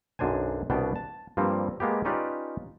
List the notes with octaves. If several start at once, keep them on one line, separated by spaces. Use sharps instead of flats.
B1 F#2 D4 C5 G#5
C2 B2 B3 D4 G5
A5
G2 F3 G3 A#3 C4
G#3 A#3 B3 G4
C#4 D#4 F4 G4 B4 D5